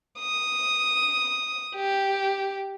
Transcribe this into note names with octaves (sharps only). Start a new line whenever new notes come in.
D#6
G4